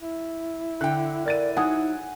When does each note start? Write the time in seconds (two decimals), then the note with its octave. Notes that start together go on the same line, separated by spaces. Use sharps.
0.01 E4
0.81 D3 G5 F#6
1.26 E4 A#4 D5 A6 D#7
1.57 F#3 D#4 F#5 G#5 D#6